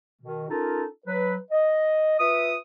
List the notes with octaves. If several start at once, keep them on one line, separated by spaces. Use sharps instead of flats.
B2 D#3
C#4 D#4 F4 A4 A#4 A5
F#3 B4
D#5
F4 B4 E5 D#6